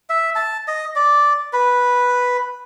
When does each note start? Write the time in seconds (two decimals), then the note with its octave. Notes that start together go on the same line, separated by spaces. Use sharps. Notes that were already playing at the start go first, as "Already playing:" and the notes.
0.10 E5
0.35 A5
0.68 D#5
0.96 D5
1.53 B4